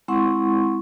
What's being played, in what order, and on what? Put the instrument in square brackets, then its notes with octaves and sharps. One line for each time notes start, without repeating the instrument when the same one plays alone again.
[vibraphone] G#3 C4 E4 F#5 C6 C#6